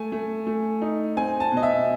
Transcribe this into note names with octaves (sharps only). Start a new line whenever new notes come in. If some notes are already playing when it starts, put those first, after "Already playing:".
Already playing: A3 G#5
A3
A3
D#4
C4 G#5
A5
B2
D#5
E5